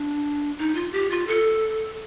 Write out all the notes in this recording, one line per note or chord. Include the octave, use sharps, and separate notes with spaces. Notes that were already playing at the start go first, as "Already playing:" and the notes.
Already playing: D4
D#4
F4
G4
F4
A4